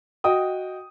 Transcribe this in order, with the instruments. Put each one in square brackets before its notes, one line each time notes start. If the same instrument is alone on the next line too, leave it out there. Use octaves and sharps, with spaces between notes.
[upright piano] F#4 D#5 G5 D#6